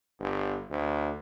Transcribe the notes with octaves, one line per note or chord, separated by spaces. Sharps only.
G1
D2